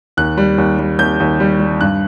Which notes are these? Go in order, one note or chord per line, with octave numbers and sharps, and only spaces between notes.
D#2 F#6
G3
D#2
G3
D#2 G6
D#2
G3
G3
G2 F#6